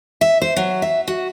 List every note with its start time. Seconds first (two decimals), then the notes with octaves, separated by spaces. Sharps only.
0.21 E5
0.42 C5
0.56 F#3
0.82 E5
1.08 F#4